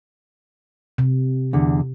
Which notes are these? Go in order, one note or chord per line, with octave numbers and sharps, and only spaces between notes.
C3
E2 D3